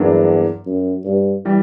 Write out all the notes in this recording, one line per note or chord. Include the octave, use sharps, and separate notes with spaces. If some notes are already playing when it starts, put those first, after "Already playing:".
Already playing: E2 G2 F#3 A#3 D4
F#2
G2
E3 G3